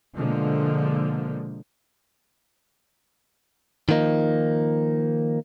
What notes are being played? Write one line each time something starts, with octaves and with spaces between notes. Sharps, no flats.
B2 D3 F3 G#3 A#3
D#3 F3 A#3 D#4